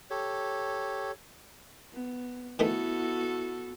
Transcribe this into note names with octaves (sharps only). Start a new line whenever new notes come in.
G4 A4 C#5
B3
D#3 E3 A3 B3 E4 F#4 A4